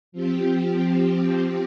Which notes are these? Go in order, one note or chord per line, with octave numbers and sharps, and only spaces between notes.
F3 C4 G4